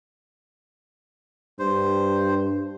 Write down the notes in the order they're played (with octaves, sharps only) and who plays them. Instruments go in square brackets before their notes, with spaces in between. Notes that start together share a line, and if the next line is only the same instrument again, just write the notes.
[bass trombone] G2 [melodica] C5